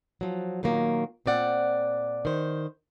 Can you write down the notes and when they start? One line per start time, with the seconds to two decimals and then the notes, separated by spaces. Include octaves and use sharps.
0.21 F3 F#3
0.63 A#2 D#3 F#3 A#3
1.26 A#2 C4 D5 F#5
2.25 D#3 C5